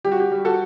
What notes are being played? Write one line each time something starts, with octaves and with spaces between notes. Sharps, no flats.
G3 G4
F#4
G4
G3
F#4 A4